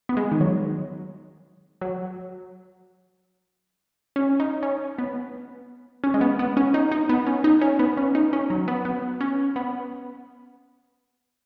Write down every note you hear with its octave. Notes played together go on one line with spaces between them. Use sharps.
B3
G#3
D#3
F#3
F#3
C#4
D#4
C#4
B3
C#4
G#3
B3
B3
C#4
D#4
D#4
B3
C#4
D#4
C#4
B3
C#4
D#4
C#4
F#3
B3
B3
C#4
B3